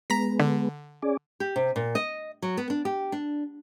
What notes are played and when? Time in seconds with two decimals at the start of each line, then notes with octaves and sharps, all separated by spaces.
0.10 G#3 B3 A#5 A#6 B6
0.40 D3
1.02 C#4 G#4 D5
1.40 G4
1.56 C3
1.76 A#2
1.95 D#5
2.42 F#3
2.57 B3
2.70 D4
2.85 G4
3.12 D4